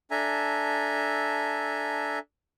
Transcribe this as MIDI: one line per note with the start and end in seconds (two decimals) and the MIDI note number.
0.11 2.19 62
0.11 2.19 69
0.11 2.19 76
0.11 2.19 80
0.11 2.19 82